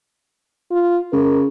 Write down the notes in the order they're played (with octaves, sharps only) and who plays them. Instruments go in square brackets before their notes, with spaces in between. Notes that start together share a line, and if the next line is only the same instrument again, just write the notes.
[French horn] F4
[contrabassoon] C#3 [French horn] A#4